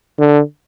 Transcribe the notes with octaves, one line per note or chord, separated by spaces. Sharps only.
D3